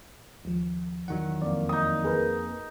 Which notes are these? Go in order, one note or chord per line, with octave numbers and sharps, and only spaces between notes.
D#2 F3
E2 D#3 F#3 F#5
F2 A#3 D5
D#4 D#6
G#4 A#4 B4